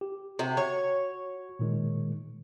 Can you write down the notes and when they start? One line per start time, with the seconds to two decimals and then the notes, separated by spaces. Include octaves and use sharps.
0.01 G4
0.39 C3 F#4
0.57 C#5
1.59 A#2 D#3 G#3